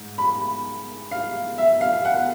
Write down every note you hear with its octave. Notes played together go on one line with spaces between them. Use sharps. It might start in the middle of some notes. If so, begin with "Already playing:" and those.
Already playing: G#2
B5
F5
E5
F5
F#5